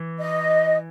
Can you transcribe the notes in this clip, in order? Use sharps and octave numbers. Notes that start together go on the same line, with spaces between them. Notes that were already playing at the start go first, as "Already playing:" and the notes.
Already playing: E3
D#5